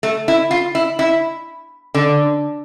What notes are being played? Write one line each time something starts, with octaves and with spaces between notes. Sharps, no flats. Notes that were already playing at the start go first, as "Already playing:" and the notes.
A3
E4
F4
E4
E4
D3